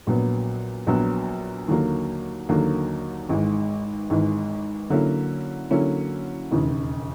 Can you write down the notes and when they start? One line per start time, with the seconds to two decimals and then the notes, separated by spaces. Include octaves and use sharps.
0.07 A#1 A#2 F#3 B3
0.87 A#1 A#2 F#3 B3
1.68 D#2 D3 F#3 A#3
2.49 D#2 D3 F#3 A#3
3.29 G#1 G#2 E3 G#3
4.10 G#1 G#2 E3 G#3
4.90 D3 F#3 A#3 C#4 E4
5.70 D3 F#3 A#3 C#4 E4
6.51 E1 D#2 C#3 E3